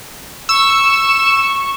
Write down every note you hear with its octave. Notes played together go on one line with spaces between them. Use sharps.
C#6 E6